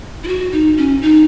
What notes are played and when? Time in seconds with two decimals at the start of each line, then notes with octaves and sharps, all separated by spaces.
0.24 E4
0.28 F#4
0.52 D#4
0.77 C#4
1.02 D#4